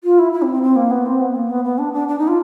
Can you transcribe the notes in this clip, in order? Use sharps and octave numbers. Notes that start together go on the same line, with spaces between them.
F4
E4
E4
C4
C4
C4
A#3
B3
C4
B3
A#3
B3
B3
D4
D4
D4
D#4
F4